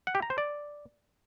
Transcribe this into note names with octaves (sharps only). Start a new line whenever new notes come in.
F#5
G4
A#5
C5
D5